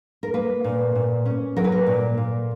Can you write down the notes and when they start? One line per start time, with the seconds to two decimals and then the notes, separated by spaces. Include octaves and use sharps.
0.23 A#4
0.34 A#3 B4
0.64 A#2
0.95 A#2
1.25 C#4
1.56 F#3 A#4
1.64 B4
1.72 A#4
1.87 A#2
2.18 A#2